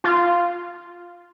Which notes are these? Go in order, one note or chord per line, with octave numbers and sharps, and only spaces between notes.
F4